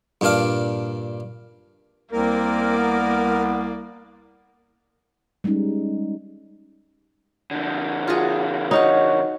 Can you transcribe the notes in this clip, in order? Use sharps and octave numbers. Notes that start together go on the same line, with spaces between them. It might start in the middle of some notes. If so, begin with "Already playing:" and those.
G2 A#2 D4 F5 D6
C2 A#3 C4 A#4 D5
B3
G3 G#3 C#4 D#4
D3 F3
F4 F#4 G#4
D#4 F#4 C#5 F5 F#5